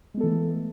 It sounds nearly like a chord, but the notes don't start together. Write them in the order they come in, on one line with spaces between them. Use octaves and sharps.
G#3 B3 A4 E3 A3